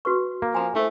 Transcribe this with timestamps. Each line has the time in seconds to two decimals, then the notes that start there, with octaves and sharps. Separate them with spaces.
0.05 F#4 B4 C#6
0.42 A#3
0.55 F3 G#5 A#5
0.76 A3 E4 C5